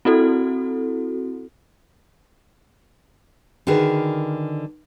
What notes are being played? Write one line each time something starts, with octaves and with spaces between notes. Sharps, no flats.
C4 E4 F#4 A4
D3 D#3 F#4 G#4 A#4 B4